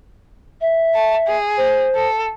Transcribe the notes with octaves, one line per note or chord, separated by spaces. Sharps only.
E5
A5
G#4
C5
A4